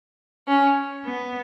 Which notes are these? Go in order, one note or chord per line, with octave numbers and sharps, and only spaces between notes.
C#4
B3